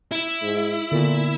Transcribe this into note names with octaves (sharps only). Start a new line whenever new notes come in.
E4
G#2
A#2 D3 B3 A4